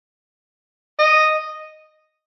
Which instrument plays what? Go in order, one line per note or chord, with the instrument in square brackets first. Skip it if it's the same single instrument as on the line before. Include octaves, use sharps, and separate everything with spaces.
[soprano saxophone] D#5